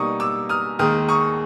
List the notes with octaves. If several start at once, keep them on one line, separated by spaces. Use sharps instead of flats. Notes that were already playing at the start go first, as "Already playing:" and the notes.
Already playing: B2 G3 A#3 D#4 C#6 D#6
D6 E6
D#6 F6
D#2 D#3 G#3 D#6 F6
C#6 D#6